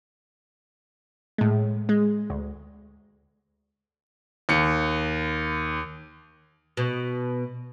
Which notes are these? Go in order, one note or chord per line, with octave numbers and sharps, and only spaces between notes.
A2 G#3
G#3
D2
D#2 C#7
B2